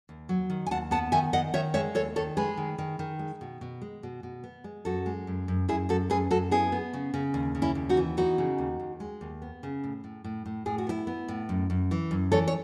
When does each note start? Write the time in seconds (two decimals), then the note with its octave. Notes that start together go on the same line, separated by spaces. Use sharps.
0.09 D#2
0.29 F#3
0.50 D#3
0.66 G#5
0.71 D#2 F#5 A5
0.91 B3 F#5 A5
1.12 D#3 E5 G#5
1.33 D#3 D#5 F#5
1.54 D#3 C#5 E5
1.74 G#3 C#5 E5
1.94 D#2 A4 C#5
2.16 D#3 A4 C#5
2.37 G#3 G#4 B4
2.57 D#3
2.78 D#3
2.99 D#3
3.19 G#3
3.41 B2
3.61 B2
3.82 G#3
4.03 B2
4.23 B2
4.44 B3
4.64 G#3
4.85 F#2 F#4 A4
5.06 G#3
5.27 F#2
5.48 F#2
5.68 F#2 E4 G#4
5.89 F#2 F#4 A4
6.10 F#2 G#4 B4
6.30 F#2 F#4 A4
6.51 B3 E4 G#4
6.72 B3
6.93 C#3
7.14 C#3
7.34 D#2
7.55 C#3
7.62 C#4 E4
7.75 D#2
7.89 D#4 F#4
7.97 E3
8.17 B3 D#4 F#4
8.38 C#3
8.58 D#2
8.79 D#2
9.00 G#3
9.21 D#2
9.42 B3
9.63 C#3
9.84 A2
10.04 A2
10.24 A2
10.46 A2
10.66 A2 G#4
10.78 F#4
10.87 B3 E4 G#4
11.07 B3
11.28 A2
11.49 F#2
11.70 F#2
11.91 E3
12.11 F#2
12.32 E3 A4 C#5
12.48 C#5